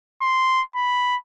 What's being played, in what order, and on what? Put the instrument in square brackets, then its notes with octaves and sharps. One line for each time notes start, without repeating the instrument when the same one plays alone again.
[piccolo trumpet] C6
B5